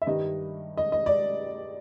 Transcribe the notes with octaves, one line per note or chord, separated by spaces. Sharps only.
E5
G2 D#3 G3 D#5
D#5
D#5
D5